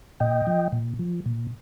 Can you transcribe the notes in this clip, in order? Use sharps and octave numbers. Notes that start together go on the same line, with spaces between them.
A#2 D#5 G5
F3
A#2
F3
A#2